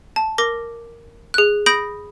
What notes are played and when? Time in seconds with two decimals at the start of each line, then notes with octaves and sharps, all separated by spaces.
0.16 A5
0.38 A#4 D6 A#6
1.34 G#4 F#6
1.66 B5 D#6 G6 A#6 D7